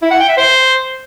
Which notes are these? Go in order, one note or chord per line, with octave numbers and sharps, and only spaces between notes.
E4
F#5
G5
E5
C5